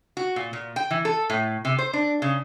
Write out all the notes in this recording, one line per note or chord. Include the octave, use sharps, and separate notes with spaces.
F#4
A#2
A#2
G5
E3
A4
A2
C3
C5
D4
C#3